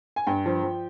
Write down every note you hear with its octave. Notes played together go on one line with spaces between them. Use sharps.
G#5
G2 G5
F3
F3